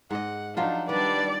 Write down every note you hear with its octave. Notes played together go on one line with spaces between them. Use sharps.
G#2 D#5 F#5
F3 F#3 D4 D#4 F4
D#3 G3 D4 B4 D5